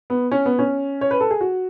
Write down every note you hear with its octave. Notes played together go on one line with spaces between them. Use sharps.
B3
C#4
B3
C#4
C#5
B4
A4
G#4
F#4